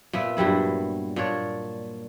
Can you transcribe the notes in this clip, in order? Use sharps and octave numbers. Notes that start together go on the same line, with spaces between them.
A#2 B3 E5
G2 F#3 G3 E4
A#2 D4 C#5 D5